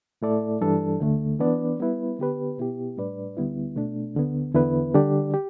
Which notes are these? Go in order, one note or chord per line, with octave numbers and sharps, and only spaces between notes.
A2 A3 E4 A4 D5
G2 E3 G3 D4 A4
D2 D3 A3
E3 B3 D4 B4 D5
G3 B3 E4 B4
D3 B3 G4 B4
B2 B3 E4 G4
A2 G3 D4 B4 D5
D2 D3 G3 B3 E4
B2 A3 D4
D2 D3 B3
E2 D3 B3 E4 B4
D3 G3 D4 G4 D5
G4